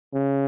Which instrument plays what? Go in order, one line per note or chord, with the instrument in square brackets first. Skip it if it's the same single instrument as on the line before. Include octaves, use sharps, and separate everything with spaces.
[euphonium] C#3